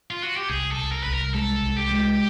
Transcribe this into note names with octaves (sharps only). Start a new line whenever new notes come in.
F4
F#4
G4
C2 G#4
A4
C2
A#4
C2 B4
A#4
G#3 A4
C2
G4
G#3